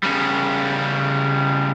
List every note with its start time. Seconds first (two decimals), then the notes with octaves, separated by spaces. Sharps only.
0.03 C#3 G3